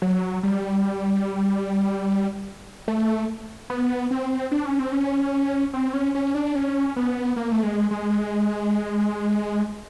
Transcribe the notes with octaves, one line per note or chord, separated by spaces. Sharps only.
F#3
G3
A3
B3
C4
D4
C#4
C4
C#4
C4
C#4
C#4
D4
C#4
B3
A#3
A3
G#3
G#3